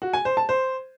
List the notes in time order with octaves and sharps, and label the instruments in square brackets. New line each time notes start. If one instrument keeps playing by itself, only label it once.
[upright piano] F#4
G#5
C5
A5
C5